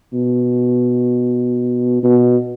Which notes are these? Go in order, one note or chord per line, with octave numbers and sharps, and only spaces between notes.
B2
B2